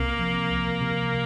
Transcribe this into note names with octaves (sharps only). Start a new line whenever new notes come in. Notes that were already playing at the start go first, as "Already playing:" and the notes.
Already playing: C2 C3 A#3 C4
F3
C2
C3